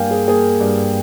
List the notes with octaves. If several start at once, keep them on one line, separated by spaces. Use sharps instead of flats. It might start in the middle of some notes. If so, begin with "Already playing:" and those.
Already playing: G2 A#3 F5 G5 G#5
G#4
A#3 G#4
G2